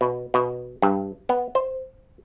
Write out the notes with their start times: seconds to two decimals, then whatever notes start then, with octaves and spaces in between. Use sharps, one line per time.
0.01 B2
0.34 B2
0.82 G2
1.29 B3
1.55 C5